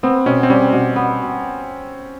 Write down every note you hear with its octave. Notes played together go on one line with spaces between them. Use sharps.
B3 C4
B2 C#4
C4
G3 C#4
B2
B3